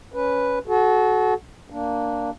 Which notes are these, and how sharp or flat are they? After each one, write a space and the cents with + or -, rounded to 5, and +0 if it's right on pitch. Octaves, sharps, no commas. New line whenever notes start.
C#4 +10 B4 +0
F#4 +0 A4 -35
A#3 -5 D4 +0